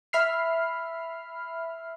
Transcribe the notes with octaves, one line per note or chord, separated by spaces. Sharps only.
E5 B5 F6 C7